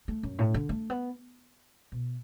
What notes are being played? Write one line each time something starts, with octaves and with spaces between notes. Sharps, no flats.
A3
F#2
A2
D3
A3
B3
B2